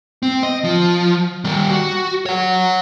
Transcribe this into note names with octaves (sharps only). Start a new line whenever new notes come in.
C4
D#5
F3
D#3 G3
F#4
C#5 F#5